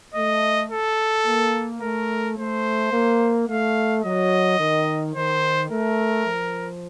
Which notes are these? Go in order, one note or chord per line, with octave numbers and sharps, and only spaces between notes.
A3 D#5
A4
A#3
A3 A#4
A3 C5
A#3
A3 F5
F#3 D#5
D#3
D#3 C5
A3 A#4
F3